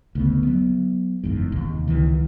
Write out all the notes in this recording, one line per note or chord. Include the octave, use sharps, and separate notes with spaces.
D2 C#3 B3
F#3 B3
F#1 E2 G#2
D#2 C3 D#3
C#2 D#3 E3